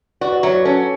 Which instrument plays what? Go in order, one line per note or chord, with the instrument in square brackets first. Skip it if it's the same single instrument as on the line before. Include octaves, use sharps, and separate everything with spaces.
[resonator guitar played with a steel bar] F#4 [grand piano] B4 D5
[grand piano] D5 F#5
[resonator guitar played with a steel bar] F#3 [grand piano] C#5 E5
[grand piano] B4 D5
[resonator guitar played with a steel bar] C#4 [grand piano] A4 C#5